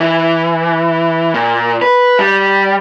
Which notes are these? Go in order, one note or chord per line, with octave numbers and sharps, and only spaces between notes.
E3
A#2
B4
G3